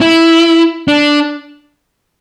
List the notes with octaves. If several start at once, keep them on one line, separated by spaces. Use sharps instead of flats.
E4
D4